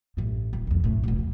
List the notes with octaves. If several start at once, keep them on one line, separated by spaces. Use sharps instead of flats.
A1 G2
D#1
C2 F2
A2
D#1 B2
E2